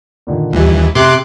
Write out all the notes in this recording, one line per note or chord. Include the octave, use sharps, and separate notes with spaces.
A#2 D3 D#3
D#2 E3 F3 G3 G4
C3 C6 D6 E6 F#6